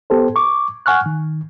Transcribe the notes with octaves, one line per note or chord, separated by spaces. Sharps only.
B3 G4 A4 C5
C#6 D6
F#5 G#5 C#6 F6 F#6
D#3